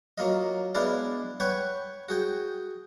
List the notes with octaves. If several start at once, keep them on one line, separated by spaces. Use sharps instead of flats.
F#3 A#3 F4 D#5
G#3 B3 D4 E4 D5 F5
B4 C#5 F#5 G5 C#6
F#4 G#4 G5